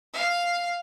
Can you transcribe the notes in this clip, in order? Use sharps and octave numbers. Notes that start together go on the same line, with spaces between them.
F5